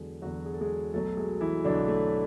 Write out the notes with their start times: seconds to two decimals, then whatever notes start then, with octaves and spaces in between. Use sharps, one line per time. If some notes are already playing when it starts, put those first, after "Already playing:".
Already playing: E2 D3 F#3 G#3 G#4
0.22 E2 D3 F#3 F#4
0.46 G#4
0.53 A4
0.61 G#3 G#4
0.93 B1 B2 F#3 A3 A4
1.17 G#3 G#4
1.41 E3 E4
1.64 B1 B2 D3 F#3 D4
1.88 A3